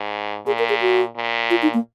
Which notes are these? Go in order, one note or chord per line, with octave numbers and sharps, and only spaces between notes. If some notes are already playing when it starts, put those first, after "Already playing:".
Already playing: G#2
A#2 G#4
A#4
G#4
F#4
A#2
F4
D#4
A#3